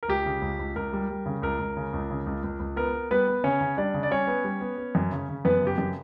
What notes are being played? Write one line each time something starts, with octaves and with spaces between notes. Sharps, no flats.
A#4
C#2 G4
C#3
C#2
C#2
C#2 A#4
G3
G3
C#3
C#2 A#4
C#2
C#3
C#2
C#3
C#2
C#2
C#2
B3 A#4
B3
G3 B3 B4
B3
C#3 C#4 C#5
C#3
G3 D4 D5
C#3
D5
G3 C#4 C#5
B3
G3
B3
B3
F#2
C#3
C#3
F#2 B3 B4
C#3 G4
F#2